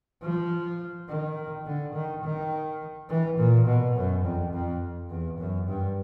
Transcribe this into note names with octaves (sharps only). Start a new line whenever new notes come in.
F3
D#3
D3
D#3
D#3
E3
A#2
B2
F#2
F2
F2
E2
F#2
G2